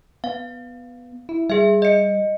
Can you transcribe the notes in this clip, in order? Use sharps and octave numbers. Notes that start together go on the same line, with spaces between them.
B3 F5
E4
G3 G#4 E5
D#5 C#7